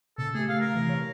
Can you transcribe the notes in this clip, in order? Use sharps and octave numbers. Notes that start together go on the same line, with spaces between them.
A#2 C#3 A4
A3 G4 G#4
F5
A#4
C3 E3
C#5